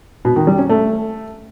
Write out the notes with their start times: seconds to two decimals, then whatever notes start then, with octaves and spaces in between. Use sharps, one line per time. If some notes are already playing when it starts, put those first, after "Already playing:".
0.25 B2
0.36 D#3
0.47 G3
0.58 C#4
0.69 A3